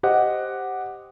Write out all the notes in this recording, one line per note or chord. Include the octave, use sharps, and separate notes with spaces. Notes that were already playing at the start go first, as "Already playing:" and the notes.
G4 C5 D#5 F#5